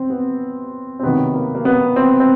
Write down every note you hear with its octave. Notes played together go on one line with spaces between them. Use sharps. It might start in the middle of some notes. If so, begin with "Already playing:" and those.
Already playing: C4
B3
C4
C3 D#3 F#3 B3
A#3
A#3
B3
C4
C4